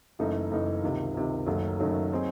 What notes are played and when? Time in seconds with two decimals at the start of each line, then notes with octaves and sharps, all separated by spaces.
0.19 F#1 F#2 E3 A3 D#4
0.51 F#1 F#2 E3 A3 D#4
0.83 C#2 C3 D#3
1.14 C#2 C3 D#3
1.46 F#1 F#2 D#3 F#3 A3
1.79 F#1 F#2 D#3 F#3 A3
2.12 F#3 C4 D#4 G#4